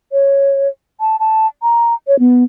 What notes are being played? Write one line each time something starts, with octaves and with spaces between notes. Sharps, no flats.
C#5
A5
A5
A#5
C#5
B3